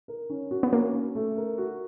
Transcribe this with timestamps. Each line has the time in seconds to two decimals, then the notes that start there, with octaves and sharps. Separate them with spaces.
0.08 A#4
0.30 C#4
0.51 F#4
0.63 B3
0.73 A#3 C#4
0.93 C#4
1.15 A3
1.37 A#4
1.58 F#4